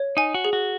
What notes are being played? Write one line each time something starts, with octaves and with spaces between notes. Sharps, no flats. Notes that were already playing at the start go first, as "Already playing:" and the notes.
Already playing: C#5
D#4 G#5
F#4
G#4
F#4